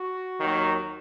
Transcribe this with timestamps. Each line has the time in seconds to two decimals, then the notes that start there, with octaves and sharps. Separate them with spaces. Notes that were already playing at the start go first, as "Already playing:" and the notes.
Already playing: F#4
0.41 D#2 D#3 F#3